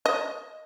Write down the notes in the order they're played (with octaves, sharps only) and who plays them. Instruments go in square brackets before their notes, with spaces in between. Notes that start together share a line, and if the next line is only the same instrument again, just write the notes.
[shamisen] D#5